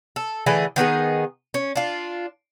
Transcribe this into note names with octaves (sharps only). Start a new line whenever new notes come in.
A4
D3 E3 A3 G#4
D#3 B3 D#4 G#4
C#4
D4 F4